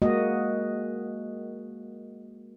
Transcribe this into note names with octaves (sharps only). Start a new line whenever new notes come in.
G#3 A#3 F#4 D#5